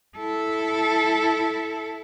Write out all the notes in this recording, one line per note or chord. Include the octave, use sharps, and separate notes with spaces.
E4 A4